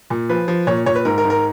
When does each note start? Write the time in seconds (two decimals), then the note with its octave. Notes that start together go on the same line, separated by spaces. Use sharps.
0.10 A#2
0.29 F3 B4
0.48 F3
0.67 A#2 C#5
0.86 A#2 C#5
0.95 B4
1.05 G#2 A#4
1.18 A#4
1.25 G#2
1.30 A#4